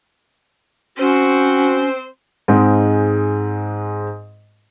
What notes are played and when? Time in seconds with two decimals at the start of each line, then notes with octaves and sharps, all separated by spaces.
0.98 C4 C#4 F#4 C5
2.48 G#2 G#3 C4